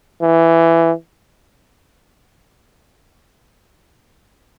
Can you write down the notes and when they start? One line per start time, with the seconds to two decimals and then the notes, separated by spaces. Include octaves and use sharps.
0.21 E3